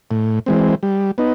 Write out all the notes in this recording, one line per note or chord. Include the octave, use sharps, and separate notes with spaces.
A2
E3 G#3 C4
G3
B3 D#4